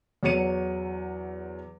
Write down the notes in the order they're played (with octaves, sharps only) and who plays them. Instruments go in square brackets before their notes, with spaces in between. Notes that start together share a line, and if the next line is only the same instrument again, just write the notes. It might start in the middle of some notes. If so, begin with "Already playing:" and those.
[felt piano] E2 F#3 C#5 C#7 D#7